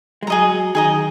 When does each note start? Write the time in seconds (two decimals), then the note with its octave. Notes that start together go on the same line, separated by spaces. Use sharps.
0.23 G#3
0.27 F#3 G#4 D#5 A#5
0.75 D#3 G#4 D#5 A#5